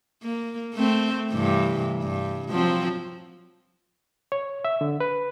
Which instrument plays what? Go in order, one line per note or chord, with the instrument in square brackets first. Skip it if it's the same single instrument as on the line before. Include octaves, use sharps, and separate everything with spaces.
[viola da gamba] A#3
A3 C4
G2 C3 E3
G2
F3 F#3 C4
[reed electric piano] C#5
E5
D3
B4